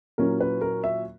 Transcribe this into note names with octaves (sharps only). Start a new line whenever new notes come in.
A#2 F#3 C#4 E4 A#4
B4
A#4
E5